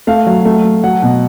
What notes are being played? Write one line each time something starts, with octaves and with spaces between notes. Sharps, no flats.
A3 F5
F#3
A3
F#3
F#3 F#5
B2